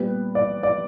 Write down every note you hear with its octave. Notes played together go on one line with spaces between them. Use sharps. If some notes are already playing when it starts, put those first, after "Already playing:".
Already playing: A#2 G3 B3 B4
D5
D5